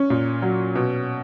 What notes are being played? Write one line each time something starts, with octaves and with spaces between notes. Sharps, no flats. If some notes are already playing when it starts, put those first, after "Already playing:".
Already playing: C#4
A#2
F#3
B2